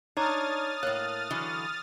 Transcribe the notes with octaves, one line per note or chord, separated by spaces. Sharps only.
D4 D#4 C#5 A#5 C#6 D#6 F6 A6
A2 A#3 C#5 F#6
D3 E3 F#3